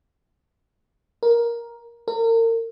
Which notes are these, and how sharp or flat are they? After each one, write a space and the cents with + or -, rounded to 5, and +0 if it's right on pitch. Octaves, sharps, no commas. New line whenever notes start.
A#4 +10
A#4 -35